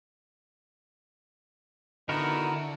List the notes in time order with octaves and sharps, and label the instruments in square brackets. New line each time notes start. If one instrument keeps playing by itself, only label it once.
[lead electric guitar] D3 [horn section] D#3 B3 D#4 [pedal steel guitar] E4 F#4 A#4